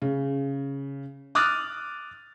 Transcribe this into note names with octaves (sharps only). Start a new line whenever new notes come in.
C#3
D6 D#6 F6 F#6 A6